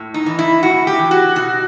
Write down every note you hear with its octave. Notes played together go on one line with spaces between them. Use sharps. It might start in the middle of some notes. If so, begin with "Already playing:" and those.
Already playing: A2
D#4
E3
E4
A2 F#4
G4
E3
F#4
B2 F#4